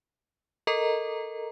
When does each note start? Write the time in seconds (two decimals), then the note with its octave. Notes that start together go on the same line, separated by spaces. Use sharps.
0.67 A4 A#4 D#5 A#5